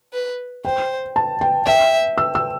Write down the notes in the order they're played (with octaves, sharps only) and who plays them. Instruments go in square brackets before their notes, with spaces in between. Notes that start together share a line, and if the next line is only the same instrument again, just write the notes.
[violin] B4
[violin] C5 [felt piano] G5
[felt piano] A5
G5
[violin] E5 [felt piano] G5
[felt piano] E6
E6